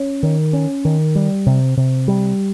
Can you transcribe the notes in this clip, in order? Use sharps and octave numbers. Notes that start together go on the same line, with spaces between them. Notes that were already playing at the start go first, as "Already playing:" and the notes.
Already playing: C#4
D#3
C#4
D#3
G3
C3
C3
G3